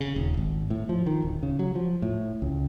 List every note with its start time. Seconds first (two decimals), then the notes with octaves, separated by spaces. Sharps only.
0.01 C#3
0.16 D#1
0.37 G#1
0.70 A2
0.89 F3
1.06 D#3
1.22 D1
1.43 C#3
1.59 F#3
1.75 F3
2.02 A2
2.42 C#2